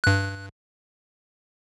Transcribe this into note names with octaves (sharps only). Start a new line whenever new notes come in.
G2 F#6